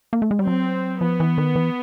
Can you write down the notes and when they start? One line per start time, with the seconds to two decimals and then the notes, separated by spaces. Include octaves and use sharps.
0.13 A#3
0.22 A3
0.31 G#3
0.39 G3
0.47 F#3 C4
1.01 F3 B3
1.20 E3
1.38 D#3
1.56 E3